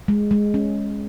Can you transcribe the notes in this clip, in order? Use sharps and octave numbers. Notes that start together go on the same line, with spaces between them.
G#3
G#3
C#4